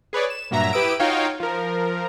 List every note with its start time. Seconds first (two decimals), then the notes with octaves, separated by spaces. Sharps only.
0.13 G#4 B4 C#5 D5
0.30 E7
0.51 G2 A#2 F#3 E5 A#5 A#6
0.73 E4 G4 B4 D#6 E6 D7
1.00 D#4 F4 F#4 C#5 F5 G5
1.40 F3 A#4